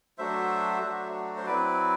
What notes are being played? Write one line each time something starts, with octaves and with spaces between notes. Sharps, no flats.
F#3 A3 D4 F#4 C5 E5
F#3 A3 D4 F#4
C5
F#3 C4 E4 B4 D5